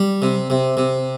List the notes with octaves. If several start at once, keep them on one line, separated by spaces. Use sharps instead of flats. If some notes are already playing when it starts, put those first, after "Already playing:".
Already playing: G3
C3
C3
C3